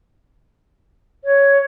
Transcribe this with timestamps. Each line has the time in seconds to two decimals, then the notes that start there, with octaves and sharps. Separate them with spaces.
1.24 C#5